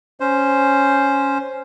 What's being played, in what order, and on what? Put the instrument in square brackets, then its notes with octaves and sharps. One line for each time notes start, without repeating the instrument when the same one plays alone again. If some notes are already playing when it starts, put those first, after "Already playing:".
[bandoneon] C#4 C5